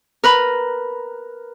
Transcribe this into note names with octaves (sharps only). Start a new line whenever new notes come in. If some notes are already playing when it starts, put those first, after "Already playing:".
A#4 B4 B5